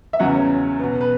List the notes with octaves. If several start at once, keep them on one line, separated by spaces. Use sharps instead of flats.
E5
E2 C#3 F#3 C#4 F#5
C#5
B2 B3
B4